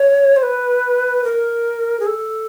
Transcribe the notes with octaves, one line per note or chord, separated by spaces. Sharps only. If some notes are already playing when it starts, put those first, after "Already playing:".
Already playing: C#5
C5
B4
A#4
G#4
A4